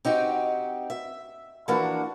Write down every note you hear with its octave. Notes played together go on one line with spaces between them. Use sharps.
C4 D#4 F#4 G4
E5
E3 F3 A#3 D4 F#4